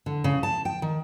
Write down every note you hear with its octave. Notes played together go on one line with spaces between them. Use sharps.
D3
C#3
A5
G5
D#3